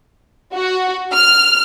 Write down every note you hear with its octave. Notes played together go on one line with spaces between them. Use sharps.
F#4
F6